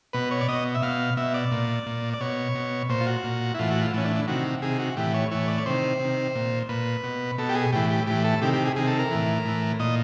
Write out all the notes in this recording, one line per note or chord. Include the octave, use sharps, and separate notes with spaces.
B2 B4
C#5
D5
B2 D#5
E5
B2 F5
B2 E5
D5
A#2
A#2
D5
B2 C#5
B2
A#2 C5
F4
F#4
A#2
E4
A2 E3 F4
F#4
F4
A2 E3 C#4
D4
D4
C3 D#3 F#4
C3 D#3 G#4
F#4
A2 E3 G4
C#5
A2 E3 C#5
D5
C#5
C3 D#3 C5
C3 D#3
A#2
A#2 B4
B2
B2 A4
G4
G#4
A2 E3 G4
G4
A2 E3 G4
A4
C3 D#3 G4
G4
G#4
C3 D#3 G#4
A4
A#4
A2 E3
A2 E3
A#2 D#5